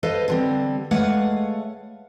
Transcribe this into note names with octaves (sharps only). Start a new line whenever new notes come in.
A4 B4 C5 D#5 F5
D3 G3 C4
G#3 A3 B4 C#5 F5 F#5